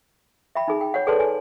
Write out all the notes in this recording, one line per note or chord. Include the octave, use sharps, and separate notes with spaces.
E5 G5 B5
D#4 G#4
G5
C#5 F#5
G#4 A4 B4 D5 A5 C6
G#5